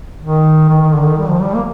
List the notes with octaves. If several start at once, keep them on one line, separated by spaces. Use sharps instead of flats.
D#3
D#3
D#3
D3
D#3
G3
F3
G3
A#3